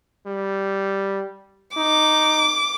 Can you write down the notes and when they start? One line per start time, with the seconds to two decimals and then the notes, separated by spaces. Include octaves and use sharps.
0.26 G3
1.77 D#4 D6